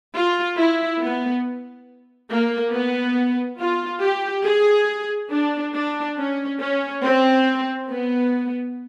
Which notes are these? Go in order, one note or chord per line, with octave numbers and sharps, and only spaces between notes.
F4
E4
B3
A#3
B3
F4
G4
G#4
D4
D4
C#4
C#4
C4
B3